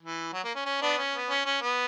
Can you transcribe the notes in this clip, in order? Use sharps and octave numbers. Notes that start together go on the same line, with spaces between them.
E3
F#3
A#3
C#4
C#4
B3 D4
C#4
B3
C#4
C#4
B3